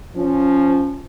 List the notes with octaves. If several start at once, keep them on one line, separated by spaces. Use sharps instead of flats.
F3 C#4